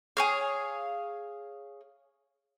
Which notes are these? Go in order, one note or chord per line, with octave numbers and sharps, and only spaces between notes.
G#4 C#5 F5